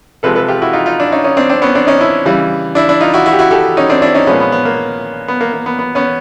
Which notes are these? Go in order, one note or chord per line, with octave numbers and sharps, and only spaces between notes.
C3 F3 G#3 A4 B4
A4 B4
F4 G4
E4 F#4
D#4 F4
D#4 F4
D4 E4
C#4 D#4
C#4 D#4
C4 D4
C4 D4
B3 C#4
C4 D4
C#4 D#4
D4 E4
C#3 E3 G3
D4 E4
D4 E4
D#4 F4
E4 F#4
E4 F#4
G4
E4 F#4
G4 A4
C#4 D#4
C4 D4
D4 E4
C#4 D#4
A#2 F3 G#3 B3 C#4
B3
B3
A#3
B3
A#3
A#3
B3
B3
B3 C#4